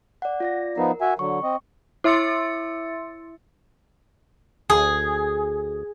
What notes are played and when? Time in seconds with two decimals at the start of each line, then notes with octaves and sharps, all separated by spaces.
0.22 D5 F#5
0.40 F4 D5 A#6
0.77 F3 B3 D#4 A#4
1.01 F#4 E5 G#5
1.19 D3 F#3 C#6
1.43 C4 D#5
2.04 E4 E5 C6 E6 A6 C#7
4.70 D2 G#4